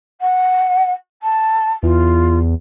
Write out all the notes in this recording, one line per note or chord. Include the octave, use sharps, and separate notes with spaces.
F#5
A5
E2 F4